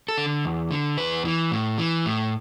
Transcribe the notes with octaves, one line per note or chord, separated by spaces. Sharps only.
A4
D3
E2
D3
E2 B4
E3
A2
E3
A2